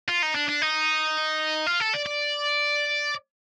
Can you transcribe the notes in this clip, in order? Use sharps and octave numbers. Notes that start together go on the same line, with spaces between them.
F4
D#4
D4
D4
D#4
F4
A4
D5
D5